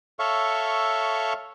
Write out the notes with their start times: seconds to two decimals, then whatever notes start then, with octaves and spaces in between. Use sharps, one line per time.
0.19 A4 C#5 E5 F5 C#6